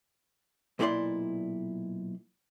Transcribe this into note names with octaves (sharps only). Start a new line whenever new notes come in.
B1 A#2 A3 E4 D5 C6